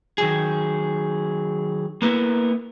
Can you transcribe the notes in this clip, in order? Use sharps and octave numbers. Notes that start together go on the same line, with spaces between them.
D#3 F#3 G#4
A#3 B3 E4 A#4